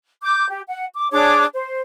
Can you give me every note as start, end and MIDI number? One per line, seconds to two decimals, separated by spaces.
0.23 0.47 86
0.23 0.47 91
0.50 0.61 67
0.68 0.86 78
0.96 1.07 86
1.12 1.44 62
1.12 1.44 68
1.12 1.44 73
1.12 1.44 86
1.53 1.80 72